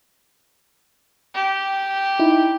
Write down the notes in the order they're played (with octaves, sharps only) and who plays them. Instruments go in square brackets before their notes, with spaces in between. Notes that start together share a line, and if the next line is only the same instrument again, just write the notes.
[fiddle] G4
[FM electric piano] D#4 E4